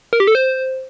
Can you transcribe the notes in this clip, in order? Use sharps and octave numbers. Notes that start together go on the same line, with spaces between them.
A#4
G4
A4
C5